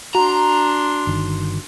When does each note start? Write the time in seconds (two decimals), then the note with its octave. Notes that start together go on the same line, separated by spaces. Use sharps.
0.15 D4 F#4 A#5 C6
1.07 G1 D#3